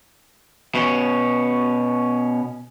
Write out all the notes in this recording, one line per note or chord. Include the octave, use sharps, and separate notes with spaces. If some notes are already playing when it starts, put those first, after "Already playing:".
B2 C#4